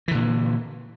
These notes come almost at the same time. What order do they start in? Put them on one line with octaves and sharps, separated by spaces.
E3 D3 A#2